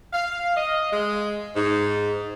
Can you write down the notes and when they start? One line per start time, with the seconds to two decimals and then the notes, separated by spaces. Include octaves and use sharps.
0.13 F5
0.56 D#5
0.91 G#3
1.55 G#2